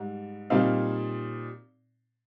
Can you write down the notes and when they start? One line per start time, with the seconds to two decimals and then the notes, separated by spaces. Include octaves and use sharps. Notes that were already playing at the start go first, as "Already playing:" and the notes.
Already playing: G#2 G3
0.50 A#2 G3 C4 D#4 F5